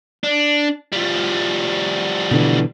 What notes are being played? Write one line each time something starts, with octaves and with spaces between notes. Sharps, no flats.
D4
F3 G3
B2 D3 E3